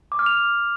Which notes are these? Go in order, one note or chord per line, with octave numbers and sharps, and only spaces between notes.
D6
F6
F7